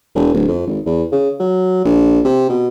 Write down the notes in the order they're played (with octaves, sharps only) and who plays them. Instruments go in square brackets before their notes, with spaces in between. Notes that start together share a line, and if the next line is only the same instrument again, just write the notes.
[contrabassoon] E1
D1
F2
G#1
E2
C#3
F#3
A#1
C3
B2